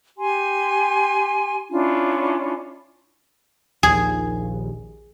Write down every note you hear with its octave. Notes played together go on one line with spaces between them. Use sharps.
G4 G#5 C6
C#4 D4 E4 F4
A#1 D#2 G#4